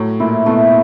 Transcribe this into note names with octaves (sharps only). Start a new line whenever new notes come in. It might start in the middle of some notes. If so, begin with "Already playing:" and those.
Already playing: A2 F#3
A#2 E4
B2 A3